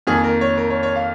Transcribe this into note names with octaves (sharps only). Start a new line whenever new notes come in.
F2 D#3 A#3 G#4
A#4
C#5
A#4
C#5
C#5
F5